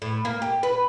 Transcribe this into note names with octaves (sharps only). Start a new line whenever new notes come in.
A2
A#3
G4
B4